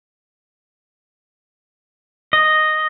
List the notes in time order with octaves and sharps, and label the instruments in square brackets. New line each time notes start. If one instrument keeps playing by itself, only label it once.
[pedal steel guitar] D#5